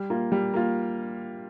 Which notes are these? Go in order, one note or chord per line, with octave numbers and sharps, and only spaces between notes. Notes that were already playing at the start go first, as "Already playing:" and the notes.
Already playing: G3
A#3 F4
G3
A#3 F4